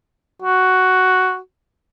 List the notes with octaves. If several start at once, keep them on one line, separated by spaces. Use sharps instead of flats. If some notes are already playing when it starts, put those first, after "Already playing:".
F#4